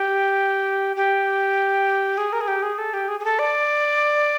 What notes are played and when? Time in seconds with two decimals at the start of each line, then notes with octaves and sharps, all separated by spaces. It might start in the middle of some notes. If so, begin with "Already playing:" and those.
Already playing: G4
0.96 G4
2.18 G#4
2.33 A#4
2.41 G#4
2.48 G4
2.63 G#4
2.78 A4
2.94 G4
3.08 G#4
3.20 G#4
3.24 A4
3.39 D5